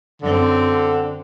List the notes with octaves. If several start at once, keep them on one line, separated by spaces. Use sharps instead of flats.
F#2 D3 C4